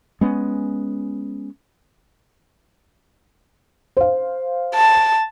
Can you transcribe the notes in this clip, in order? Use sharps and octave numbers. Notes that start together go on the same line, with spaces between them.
G#3 B3 C#4
C5 F5
A5